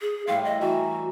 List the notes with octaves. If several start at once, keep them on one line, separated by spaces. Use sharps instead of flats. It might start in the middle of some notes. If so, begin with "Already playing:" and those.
G#4
A2 G3 F5 C6
D#5
E3 F#4 E5 A#5